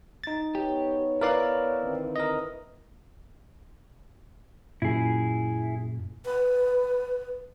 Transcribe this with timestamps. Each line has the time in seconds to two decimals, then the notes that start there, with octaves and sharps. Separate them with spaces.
0.24 D#4 A6
0.55 B3 G4 C#5
1.21 E4 A#4 B4 D5 F5
1.82 D3 D#3 C4
2.16 A#4 D#5
4.82 F#2 A#2 E4 G#4
6.25 B4